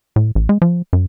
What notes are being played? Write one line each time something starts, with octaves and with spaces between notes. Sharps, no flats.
A2
A1
G#3
F3
F#2